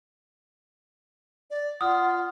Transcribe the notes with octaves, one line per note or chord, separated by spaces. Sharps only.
D5
F4 F#5 D#6 F6